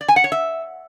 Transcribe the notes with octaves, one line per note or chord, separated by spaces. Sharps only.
D5
G#5
F#5
C#5
E5